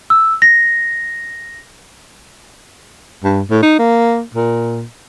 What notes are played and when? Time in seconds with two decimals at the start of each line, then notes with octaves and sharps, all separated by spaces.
0.10 E6
0.42 A#6
3.24 G2
3.51 A2
3.63 D#4
3.79 A#3
4.34 A#2